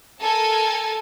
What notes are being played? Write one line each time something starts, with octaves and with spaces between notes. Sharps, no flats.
A4 A#4 G#5 A5